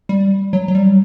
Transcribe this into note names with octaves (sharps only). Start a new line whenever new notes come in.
G3
F#3
F#3
G3